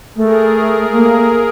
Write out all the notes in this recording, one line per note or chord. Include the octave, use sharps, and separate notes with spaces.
A3 G#4 A#4
A#3